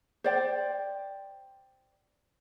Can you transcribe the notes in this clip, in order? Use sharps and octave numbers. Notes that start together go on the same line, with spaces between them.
C5 D5 G5